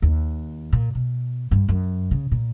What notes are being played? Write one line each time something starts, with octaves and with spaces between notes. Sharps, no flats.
D#2
A#2
B2
G2
F#2
C#3
A#2